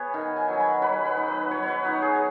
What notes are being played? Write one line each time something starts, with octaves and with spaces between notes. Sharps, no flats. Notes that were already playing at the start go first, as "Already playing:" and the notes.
Already playing: B3 G#4 B4 C#5
D#3 G#5
G#5
F#3 G#5
B5
F#3 B4
B4
D#4
B4
F#3 C#5
B4 C#5
D#4 F#4
G#4